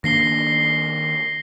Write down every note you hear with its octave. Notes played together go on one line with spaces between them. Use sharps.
D#3 A#3 D4 A#6 C7 G7